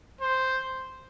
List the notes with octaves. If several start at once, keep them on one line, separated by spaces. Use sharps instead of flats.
C5